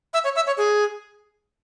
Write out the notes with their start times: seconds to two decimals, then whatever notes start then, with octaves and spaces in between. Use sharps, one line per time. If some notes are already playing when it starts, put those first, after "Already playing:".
0.14 E5
0.24 C#5
0.36 E5
0.47 C#5
0.57 G#4